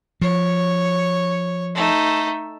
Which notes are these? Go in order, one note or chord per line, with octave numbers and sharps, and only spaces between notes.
F3 C#5
A3 D#4